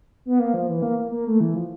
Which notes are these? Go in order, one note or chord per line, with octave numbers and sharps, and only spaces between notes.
B3
A#3
F3
E3
A#3
A#3
A#3
A3
E3
F3